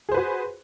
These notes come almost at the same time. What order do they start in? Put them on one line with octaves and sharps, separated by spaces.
G#4 C5 B4 F#4